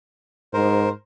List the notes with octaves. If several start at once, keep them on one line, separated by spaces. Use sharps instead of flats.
G#2 A#4 C5